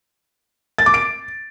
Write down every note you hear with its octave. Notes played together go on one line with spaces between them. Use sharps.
A6
D6
D7